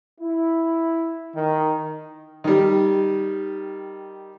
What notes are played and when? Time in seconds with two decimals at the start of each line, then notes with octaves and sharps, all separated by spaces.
0.21 E4
1.35 D#3
2.44 D#3 G3